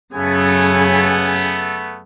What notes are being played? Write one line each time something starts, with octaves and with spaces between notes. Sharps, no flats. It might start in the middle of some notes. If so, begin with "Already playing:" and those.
F#2 C#3 A3 B3 G#5